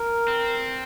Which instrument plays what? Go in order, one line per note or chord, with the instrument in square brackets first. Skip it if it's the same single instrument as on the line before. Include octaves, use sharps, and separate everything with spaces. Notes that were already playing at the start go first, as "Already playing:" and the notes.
Already playing: [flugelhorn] A#4
[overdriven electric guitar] C4